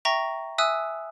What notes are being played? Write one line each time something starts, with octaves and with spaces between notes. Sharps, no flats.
E5 G5 A#5 C#6 A#6
E5 G#5 D#6 E6 F#6